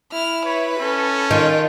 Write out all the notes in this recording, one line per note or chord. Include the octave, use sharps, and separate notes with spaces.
E4 F6
B4 C#5
C#4 A4
D#3 F4